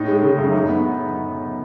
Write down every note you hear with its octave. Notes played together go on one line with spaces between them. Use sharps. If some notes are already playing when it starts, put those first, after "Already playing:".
Already playing: A2 D#4
G#3
C#3
F#2
D#4
B3